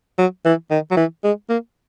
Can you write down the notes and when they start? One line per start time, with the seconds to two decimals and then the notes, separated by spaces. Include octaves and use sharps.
0.18 F#3
0.45 E3
0.71 D#3
0.91 F#3
0.97 E3
1.24 G#3
1.50 A#3